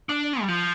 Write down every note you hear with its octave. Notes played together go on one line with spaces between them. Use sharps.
D4
G3
F3